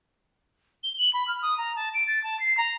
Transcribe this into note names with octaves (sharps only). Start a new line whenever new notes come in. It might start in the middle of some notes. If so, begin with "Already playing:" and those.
G7
F#7
B5
F6
D#6
A#5
A5
D7
A6
A5
C7
A#5